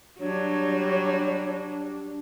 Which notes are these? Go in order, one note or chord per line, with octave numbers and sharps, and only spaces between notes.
F#3 G3 D4 C#5